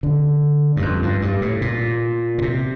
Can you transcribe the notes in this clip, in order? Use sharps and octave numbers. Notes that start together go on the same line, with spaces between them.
D3
G2
F2
G2
G2
A2
A#2
A#2
C3